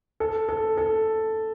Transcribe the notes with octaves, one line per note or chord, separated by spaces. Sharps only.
A4
A4
A4